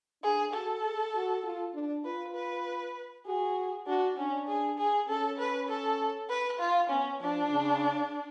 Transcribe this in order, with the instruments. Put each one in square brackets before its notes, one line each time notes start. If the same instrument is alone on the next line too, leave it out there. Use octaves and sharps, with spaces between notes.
[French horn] D4 [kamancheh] G#4
[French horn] F#4 [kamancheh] A4
[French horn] G#4
F#4
F4
D4
[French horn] F4 [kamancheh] B4
[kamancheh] B4
[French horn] F#4 [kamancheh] G#4
[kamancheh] D4 [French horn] F#4
[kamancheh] C#4 [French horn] D4
[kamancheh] G#4
G#4
[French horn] C#4 [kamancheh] A4
[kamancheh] B4
A4
B4
F4
[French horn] B3 [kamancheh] C#4
[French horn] F3 [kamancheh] D4
[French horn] C#3